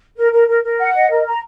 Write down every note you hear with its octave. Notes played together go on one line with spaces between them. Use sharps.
A#4
A#4
A#4
A#4
F#5
D#5
A#4
A#5